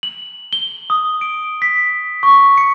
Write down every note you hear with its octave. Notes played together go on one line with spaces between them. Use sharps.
F#7
G7
D#6
D7
B6
C#6
C#7